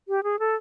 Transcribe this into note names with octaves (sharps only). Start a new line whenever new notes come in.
G4
G#4
A4